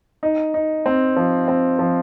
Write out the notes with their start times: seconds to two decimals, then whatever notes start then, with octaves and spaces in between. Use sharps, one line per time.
0.23 D#4
0.54 D#4
0.86 C4
1.16 F3
1.48 C4
1.79 F3